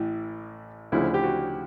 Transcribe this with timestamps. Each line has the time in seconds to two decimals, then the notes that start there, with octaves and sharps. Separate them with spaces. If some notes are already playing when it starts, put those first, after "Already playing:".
Already playing: A1 A2 E3
0.92 D2 C#3 F3 E4
1.14 G4
1.24 F#4